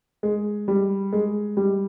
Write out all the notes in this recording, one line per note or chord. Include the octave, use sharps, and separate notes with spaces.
G#3
G3
G#3
G3